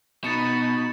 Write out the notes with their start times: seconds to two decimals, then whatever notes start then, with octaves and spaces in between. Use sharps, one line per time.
0.24 B2 D#4 B5 A6 C#7 E7